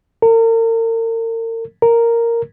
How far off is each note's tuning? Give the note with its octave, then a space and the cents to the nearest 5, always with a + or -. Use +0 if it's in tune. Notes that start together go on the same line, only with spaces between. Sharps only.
A#4 -40
A#4 -5